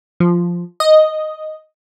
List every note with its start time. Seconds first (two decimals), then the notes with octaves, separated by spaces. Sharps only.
0.20 F3
0.80 D#5